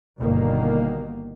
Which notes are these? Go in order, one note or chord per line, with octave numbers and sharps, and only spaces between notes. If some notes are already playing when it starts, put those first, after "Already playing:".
G1 B2 D#3 A#3